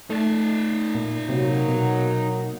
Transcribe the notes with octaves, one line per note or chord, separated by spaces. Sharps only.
A3 D#4 D5
A#2
C3 F#3 A#3
B2